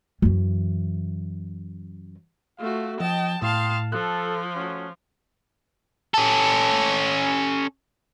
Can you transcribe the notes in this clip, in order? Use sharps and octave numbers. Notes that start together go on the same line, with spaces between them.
F#2 E3
A3 F4 F#4 F5
F3 D#5 G5 A5
A2 F5 G5 A5 C6 D#6
F3 A4 F#6
A3 C#4 F#4
C#4 A4